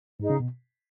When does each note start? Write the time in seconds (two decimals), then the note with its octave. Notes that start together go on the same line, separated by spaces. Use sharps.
0.20 G#2 D#4 G#4 D#5
0.30 C#3
0.40 B2